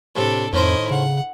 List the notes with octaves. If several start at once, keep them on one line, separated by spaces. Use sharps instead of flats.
A2 C3 D4 A4
F2 A2 D#3 E4 C5 D#5
C#3 F#5